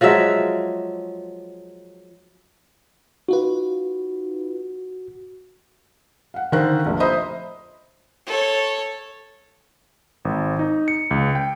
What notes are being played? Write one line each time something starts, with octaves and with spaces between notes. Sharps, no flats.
F3 F#3 G#3 E5
D#4 F4 F#4 B4
F5 F#5
D3 D#3 A#4 C5 F5 F#6
F1 A#1
C5 D#5 E5 A#5 B5 D#6
A4 C#5
G#1
D#4
C#7
C#2
G5